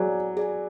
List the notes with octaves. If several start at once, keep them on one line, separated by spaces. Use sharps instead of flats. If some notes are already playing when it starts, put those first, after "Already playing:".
Already playing: F#3 G#4 D5 G#5
G#4 D5 G#5